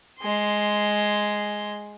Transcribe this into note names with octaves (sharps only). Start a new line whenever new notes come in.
G#3 C6